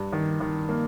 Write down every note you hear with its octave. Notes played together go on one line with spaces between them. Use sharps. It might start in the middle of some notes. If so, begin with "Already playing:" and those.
Already playing: G2
D#3
D#3
A#3